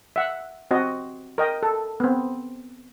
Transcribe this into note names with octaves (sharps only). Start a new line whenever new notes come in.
E5 F#5
C4 F#4 D#5
A#4 D#5 G5
A4
B3 C4